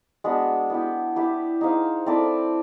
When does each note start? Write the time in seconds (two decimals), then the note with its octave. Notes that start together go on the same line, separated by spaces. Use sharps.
0.24 G#3 B3 D4 F#4
0.70 B3 E4 G4
1.16 E4 G4 B4
1.61 D#4 G#4 C5 F5
2.06 C4 E4 A4 D5